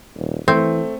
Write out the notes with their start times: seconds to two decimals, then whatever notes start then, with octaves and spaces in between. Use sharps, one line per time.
0.16 D#1
0.48 E3 A3 C4